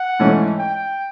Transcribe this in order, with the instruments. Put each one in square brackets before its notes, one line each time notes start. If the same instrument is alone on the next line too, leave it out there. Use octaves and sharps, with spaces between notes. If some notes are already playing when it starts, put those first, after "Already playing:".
Already playing: [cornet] F#5
[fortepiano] G#2 E3 A3 C#4
[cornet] G5